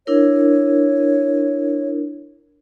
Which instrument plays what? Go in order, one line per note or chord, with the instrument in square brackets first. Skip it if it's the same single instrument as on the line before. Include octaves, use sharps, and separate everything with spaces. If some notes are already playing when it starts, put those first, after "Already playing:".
[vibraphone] D4 E4 A#4 [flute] C#5